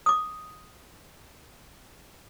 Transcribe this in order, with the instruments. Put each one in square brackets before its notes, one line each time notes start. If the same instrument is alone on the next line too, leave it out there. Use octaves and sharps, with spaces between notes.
[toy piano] D6 D#6